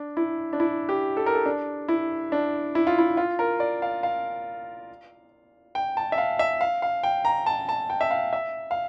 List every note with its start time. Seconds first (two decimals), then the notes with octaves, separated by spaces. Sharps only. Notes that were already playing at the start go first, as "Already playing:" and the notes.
Already playing: D4
0.17 E4
0.53 D4
0.60 E4
0.89 G4
1.17 A4
1.26 A#4
1.35 A4
1.46 D4
1.88 E4
2.32 D4
2.75 E4
2.87 F4
2.98 E4
3.17 F4
3.39 A#4
3.60 D5
3.82 F5
4.03 F5
5.75 G5
5.97 A5
6.12 E5
6.18 F5
6.39 E5
6.61 F5
6.82 F5
7.03 G5
7.25 A#5
7.46 A5
7.69 A5
7.90 G5
8.01 E5
8.11 F5
8.33 E5
8.71 F5